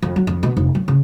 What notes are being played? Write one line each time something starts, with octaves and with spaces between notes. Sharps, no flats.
F2
F#3
F2
B2
F1
F#3
C#3